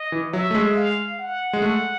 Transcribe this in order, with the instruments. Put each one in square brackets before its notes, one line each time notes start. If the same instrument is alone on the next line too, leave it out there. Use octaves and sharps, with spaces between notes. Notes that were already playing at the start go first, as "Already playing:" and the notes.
Already playing: [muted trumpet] D#5
[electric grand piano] E3
[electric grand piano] F#3 [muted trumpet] E5
[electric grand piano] A3
G#3
[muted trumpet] F5
F#5
[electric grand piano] G#3
A3